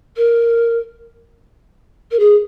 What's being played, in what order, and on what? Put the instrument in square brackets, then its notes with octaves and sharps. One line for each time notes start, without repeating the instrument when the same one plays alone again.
[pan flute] A#4
A#4
G#4